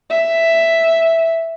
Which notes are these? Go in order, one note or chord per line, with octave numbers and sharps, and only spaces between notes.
E5